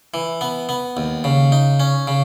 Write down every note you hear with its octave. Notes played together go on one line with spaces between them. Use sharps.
E3
B3
B3
D#2
C#3
D#4
C#4
C#3